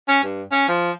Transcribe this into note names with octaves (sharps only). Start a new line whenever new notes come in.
C#4
G2
C#4
F3